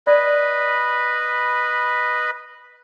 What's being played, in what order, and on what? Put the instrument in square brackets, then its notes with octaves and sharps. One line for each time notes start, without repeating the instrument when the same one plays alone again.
[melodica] B4 D#5 B5 [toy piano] D5